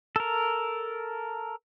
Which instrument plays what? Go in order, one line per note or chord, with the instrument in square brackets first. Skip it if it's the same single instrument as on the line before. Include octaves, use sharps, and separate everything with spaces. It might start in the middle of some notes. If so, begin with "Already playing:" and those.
[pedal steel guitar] A4 A#4